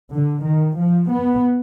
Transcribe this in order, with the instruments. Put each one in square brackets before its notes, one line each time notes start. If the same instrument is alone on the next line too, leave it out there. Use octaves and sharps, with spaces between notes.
[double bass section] D3
D#3
F3
B3